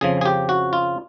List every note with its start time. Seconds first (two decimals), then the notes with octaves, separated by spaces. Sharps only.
0.01 F2 C#3 F3 G#4
0.21 G#4
0.25 G4
0.49 F#4
0.73 F4